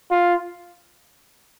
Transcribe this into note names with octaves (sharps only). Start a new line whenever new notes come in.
F4